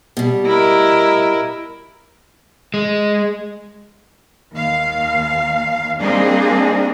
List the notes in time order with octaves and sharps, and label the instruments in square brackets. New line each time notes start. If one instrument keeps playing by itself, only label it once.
[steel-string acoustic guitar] B2 G3
[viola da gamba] E4 A#4 D#5
[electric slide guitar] G#3
[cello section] D#2 F5
G3 A#3 C4 D4 D#4 G#4